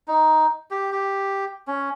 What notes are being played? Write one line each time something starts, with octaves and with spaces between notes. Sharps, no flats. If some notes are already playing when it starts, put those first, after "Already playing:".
D#4
G4
G4
C#4